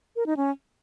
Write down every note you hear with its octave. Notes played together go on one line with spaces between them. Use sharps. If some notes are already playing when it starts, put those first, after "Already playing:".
A#4
D#4
C#4